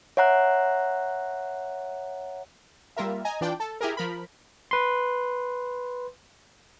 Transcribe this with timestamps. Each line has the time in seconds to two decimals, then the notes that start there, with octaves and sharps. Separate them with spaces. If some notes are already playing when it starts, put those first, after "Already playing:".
0.17 C#5 E5 F#5 A#5 F#6
2.97 G3 A#3 F4 A#4 E5
3.25 D#5 G#5 A#5
3.41 E3 D4 F4 D5 G5
3.60 A4
3.81 E4 G4 G#4 A#4
3.97 F3 A#4 B5
4.71 B4 C6